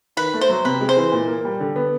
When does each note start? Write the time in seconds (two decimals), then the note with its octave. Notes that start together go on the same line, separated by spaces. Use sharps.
0.17 D#3 B4
0.34 A3
0.41 C5
0.49 F#3
0.65 C3 B4
0.81 G#3
0.89 C5
0.97 E3
1.12 A#2
1.28 A#3
1.45 G3
1.60 D3
1.76 B3